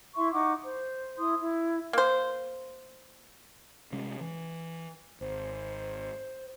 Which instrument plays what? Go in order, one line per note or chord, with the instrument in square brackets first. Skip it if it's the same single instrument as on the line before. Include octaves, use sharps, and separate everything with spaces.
[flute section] E4 E5 C6 C#6
D#4 F#5 C#6 D6
C5
E4 C6 D#6
E4
[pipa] A#3 C5
[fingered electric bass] C3 G#3 C#4
E3
[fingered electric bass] G#1 [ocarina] C5